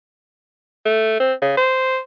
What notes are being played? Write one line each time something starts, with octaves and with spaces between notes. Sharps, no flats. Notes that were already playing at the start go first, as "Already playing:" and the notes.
A3
C4
C#3
C5